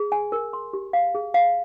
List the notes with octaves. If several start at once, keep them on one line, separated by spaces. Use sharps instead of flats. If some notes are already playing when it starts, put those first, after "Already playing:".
Already playing: G#4
G#5
A#4
C6
G4
F5
G#4
F5